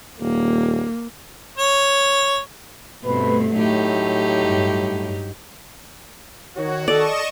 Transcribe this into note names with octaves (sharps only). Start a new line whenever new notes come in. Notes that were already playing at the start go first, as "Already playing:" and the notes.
D#1 A#3
C#5
G2 B2 A3 C4 B4
A2 F#3 D#4 G4
G2
D#3 D#4 F#4 C#5
A4 D5 D#5 C#6 E7